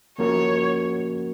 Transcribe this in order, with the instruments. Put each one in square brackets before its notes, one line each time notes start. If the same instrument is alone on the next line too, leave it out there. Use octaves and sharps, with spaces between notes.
[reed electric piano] F3 A#3 C#4 F#4 A#4 [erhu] C#5